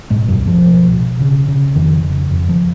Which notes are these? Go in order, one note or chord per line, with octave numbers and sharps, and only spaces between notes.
G#2 B2 G#3
F#2 F#3
C#2
F3
B2
B2
C#3
C#3
F2 D#3
C#3
F2
F3